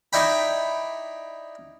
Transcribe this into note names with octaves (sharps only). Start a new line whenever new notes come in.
D#4 E4 D5 G5 B5